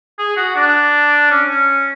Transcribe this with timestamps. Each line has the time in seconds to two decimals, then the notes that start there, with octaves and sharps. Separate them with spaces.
0.19 G#4
0.36 F#4
0.55 D4
1.31 C#4
1.49 C#4